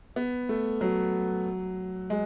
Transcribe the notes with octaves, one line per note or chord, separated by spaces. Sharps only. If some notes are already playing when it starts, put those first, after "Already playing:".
B3
A3
F#3
G#3